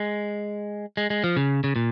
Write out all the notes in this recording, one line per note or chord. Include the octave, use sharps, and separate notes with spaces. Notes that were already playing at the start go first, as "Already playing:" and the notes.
Already playing: G#3
G#3
G#3
F3
C#3
C#3
A#2